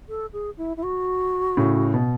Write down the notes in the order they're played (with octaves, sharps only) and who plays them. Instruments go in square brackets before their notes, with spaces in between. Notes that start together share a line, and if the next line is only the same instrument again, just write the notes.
[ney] A4
G#4
E4
E4
F#4
[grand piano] A2 C#3
B2